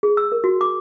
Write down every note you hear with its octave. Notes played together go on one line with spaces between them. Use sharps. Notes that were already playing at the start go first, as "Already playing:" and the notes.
G#4
E6
A#4
F#4
D6